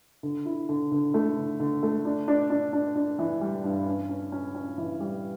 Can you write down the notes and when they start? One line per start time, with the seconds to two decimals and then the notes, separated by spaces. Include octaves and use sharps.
0.23 D3
0.45 E4
0.69 D3
0.92 D3
1.14 A3
1.36 D3
1.60 D3
1.83 A3
2.05 D4
2.28 D4
2.50 D4
2.73 D4
2.95 D4
3.19 E3
3.41 G3
3.64 G2
3.86 C#4
4.09 C#4
4.32 C#4
4.55 C#4
4.78 E3
5.00 G3